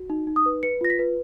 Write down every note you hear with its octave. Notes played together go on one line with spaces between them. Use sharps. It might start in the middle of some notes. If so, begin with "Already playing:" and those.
Already playing: F#4
D#4
D#4
D#6
B4
B4 C#7
F4 A#6
B6
B4